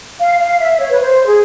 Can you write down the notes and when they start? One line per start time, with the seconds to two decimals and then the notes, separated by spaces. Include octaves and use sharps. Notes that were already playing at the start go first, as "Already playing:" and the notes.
0.20 F5
0.39 F5
0.60 E5
0.81 C#5
0.90 B4
1.00 C5
1.27 G#4